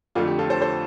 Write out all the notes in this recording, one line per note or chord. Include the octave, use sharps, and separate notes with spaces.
F2 D3 A3 F4
G4
F4 A4
A4 C5
A4 C5